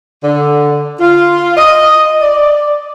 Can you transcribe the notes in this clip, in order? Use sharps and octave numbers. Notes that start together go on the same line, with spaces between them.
D3
F4
D#5
D5